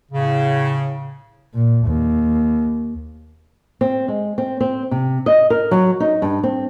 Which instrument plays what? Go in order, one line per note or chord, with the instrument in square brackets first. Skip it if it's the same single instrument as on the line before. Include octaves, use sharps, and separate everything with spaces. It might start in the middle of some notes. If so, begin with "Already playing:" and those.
[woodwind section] A2 C#3
[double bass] A#2
D#2
[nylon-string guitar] C4
G#3
C4
C4
C3
D#5
A#4
F#3
D#4
G2
C4